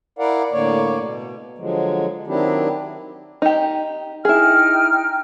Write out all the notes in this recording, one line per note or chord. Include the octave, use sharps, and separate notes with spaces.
E4 A#4 D5 F5 F#5
A2 D3 A#3 C#5 D5
B2
D3 F3 F#3 G#3
D#3 F#3 C4 D4 E4 G4
D#4 G4
D#4 E4 G#4 G5 F6